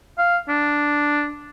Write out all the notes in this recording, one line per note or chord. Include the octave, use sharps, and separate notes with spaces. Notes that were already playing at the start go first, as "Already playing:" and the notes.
F5
D4